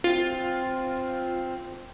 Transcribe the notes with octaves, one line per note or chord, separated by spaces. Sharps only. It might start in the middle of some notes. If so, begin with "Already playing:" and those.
C4 F4